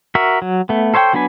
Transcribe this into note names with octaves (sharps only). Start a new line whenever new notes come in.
F#4 A#4 E5
F#3
A3 B3
A4 C5 C#5 F5 G5
F#3 B3 D4 B4 G#5